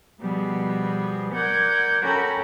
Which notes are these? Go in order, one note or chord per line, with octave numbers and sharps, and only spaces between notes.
B2 F3 G3 B3 G#4
A#4 D5 F#5 G6 G#6
C#4 F#4 A4 A#4 G5 B5